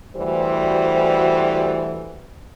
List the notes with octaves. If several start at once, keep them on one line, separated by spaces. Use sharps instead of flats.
D2 E3 G3 F#4 C5